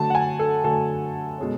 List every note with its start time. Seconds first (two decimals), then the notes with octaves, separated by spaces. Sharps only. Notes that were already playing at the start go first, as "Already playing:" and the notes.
Already playing: D3 F#3 A3 A5
0.10 F#5
0.15 G#5
0.39 A4
0.64 D3 F#3 A3 A4
1.38 B2 G#3 C#4